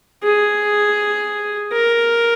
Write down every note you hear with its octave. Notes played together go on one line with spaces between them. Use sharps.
G#4
A#4